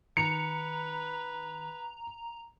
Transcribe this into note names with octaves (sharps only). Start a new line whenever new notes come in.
D#3 B4 A#5 C#7